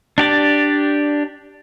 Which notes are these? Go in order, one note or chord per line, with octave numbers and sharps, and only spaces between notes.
D4 G4 D5